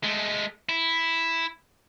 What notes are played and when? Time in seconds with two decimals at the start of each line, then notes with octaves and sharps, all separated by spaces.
0.04 G#3 A3
0.69 E4